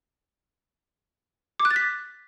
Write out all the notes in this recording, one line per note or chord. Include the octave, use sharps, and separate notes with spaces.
D6
F#6
A6
B6